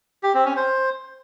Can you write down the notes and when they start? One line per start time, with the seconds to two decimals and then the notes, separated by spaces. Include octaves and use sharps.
0.23 G4
0.34 C4
0.45 C#4
0.56 C5